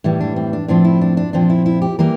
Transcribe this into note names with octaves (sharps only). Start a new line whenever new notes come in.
A2 E3 G3
D4
C4
D4
A2 F3 C4 D4
E4
D4
D4
A#2 F3 C4 D4
E4
E4
G4
E3 G3 A#3 A#4